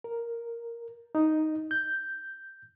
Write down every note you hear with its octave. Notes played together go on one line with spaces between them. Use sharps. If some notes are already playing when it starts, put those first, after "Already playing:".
A#4
D#4
G6